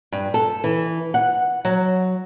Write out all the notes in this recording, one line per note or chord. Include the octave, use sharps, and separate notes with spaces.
G2
A4
E3
F#5
F#3